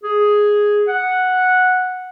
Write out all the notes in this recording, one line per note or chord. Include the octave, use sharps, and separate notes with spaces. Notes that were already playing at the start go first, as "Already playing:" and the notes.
G#4
F#5